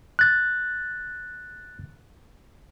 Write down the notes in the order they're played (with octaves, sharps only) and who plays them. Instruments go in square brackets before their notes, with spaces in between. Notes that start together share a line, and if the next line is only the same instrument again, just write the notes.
[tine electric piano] F#6 A6